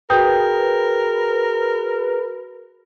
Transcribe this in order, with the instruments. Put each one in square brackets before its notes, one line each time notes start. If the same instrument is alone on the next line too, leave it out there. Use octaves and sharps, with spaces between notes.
[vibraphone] F#4 G#4 [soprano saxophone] A#4 [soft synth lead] B4 [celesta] G5 D#6 G6